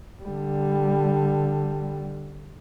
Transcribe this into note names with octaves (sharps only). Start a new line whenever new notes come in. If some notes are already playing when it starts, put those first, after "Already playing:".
D3 G3